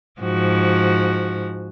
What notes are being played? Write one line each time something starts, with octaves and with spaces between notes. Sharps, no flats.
G#2 F3 F#4